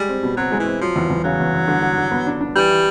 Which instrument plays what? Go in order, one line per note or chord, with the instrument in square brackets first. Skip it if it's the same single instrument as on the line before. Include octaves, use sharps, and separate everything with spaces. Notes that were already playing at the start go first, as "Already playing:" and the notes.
Already playing: [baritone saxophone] G3 [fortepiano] G#3
[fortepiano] C4
B2
[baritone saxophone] F#3 [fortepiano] C4
[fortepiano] G#3
[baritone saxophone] E3
[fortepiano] C4
[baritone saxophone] F3 [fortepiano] F#3
[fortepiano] E2
E2
[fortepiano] C#3 [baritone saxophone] F#3
[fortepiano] E2
E2
D3
D3
D3
B3
D4
D4
[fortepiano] E3 [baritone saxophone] G3
[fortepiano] E3